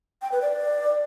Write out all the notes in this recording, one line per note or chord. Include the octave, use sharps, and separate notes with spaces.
G5
B4
D5